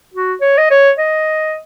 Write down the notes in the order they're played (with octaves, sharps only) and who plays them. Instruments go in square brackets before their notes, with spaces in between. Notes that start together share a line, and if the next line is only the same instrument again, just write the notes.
[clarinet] F#4
C#5
D#5
C#5
D#5